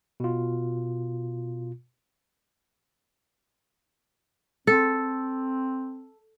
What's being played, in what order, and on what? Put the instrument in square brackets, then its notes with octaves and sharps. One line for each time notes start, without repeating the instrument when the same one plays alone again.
[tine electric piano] B2 F4
[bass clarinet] C4 [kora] A4